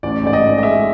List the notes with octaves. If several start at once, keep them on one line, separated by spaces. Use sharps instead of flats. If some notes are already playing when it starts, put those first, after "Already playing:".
A1 D5
G#2 D5
D#5
G#2
D#5
G#3 E5